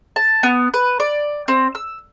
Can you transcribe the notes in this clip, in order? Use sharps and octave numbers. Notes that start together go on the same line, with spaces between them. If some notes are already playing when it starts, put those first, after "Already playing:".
A5
B3
B4
D5
C4
E6